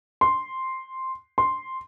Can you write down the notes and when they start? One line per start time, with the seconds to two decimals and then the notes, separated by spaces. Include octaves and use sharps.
0.21 C6
1.38 C6